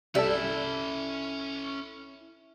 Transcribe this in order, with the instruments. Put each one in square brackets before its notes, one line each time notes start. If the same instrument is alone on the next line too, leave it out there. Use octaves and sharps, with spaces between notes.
[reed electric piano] C2 A4 [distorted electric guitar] C#4 A5 [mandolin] E4 [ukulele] G4 D5